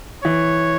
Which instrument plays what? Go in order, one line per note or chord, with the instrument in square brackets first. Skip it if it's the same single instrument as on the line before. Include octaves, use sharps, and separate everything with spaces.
[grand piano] E3 [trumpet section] C#5